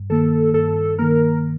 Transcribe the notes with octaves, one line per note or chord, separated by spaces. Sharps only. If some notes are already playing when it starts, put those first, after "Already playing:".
Already playing: G2
D#3 A#3 A4
G2 A4
D#3 A#3 A#4